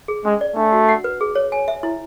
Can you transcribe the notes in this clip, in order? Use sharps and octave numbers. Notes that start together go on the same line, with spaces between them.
G#4
G#3 C#4
D5
A3 D4
F#4
F#5
B4
G#4
C#5
G#5
E5
E4